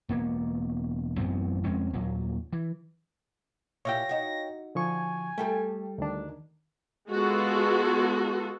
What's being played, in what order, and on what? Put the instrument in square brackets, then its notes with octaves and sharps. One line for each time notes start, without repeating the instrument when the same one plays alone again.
[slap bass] E1 A#3 B3
A1 F#2 B3 C4
F2 G#3 C4 C#4
D#2 A#2 F#3
E3
[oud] A#2 E4 G4 [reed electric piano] C#5 F5 G5 [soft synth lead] A#6
[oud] D#4 F#4
[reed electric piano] D3 F3 C#6 [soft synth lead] G#5
[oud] G3 G4 A4 [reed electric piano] A3
[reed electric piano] D2 D4 [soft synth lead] D#3
[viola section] G#3 B3 F4 F#4 A4